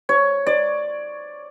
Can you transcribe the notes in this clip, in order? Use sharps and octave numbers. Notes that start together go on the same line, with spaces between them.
C#5
D5